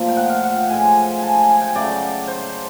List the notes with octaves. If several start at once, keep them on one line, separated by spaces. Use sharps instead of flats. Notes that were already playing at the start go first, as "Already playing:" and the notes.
Already playing: A#2 F3 A3
G5
F#5
F5
F#5
G5
A2 F3 G#3 G#5
G#5 A5
G#5
G#5
G5
C#3 F#3 A3 D5
C5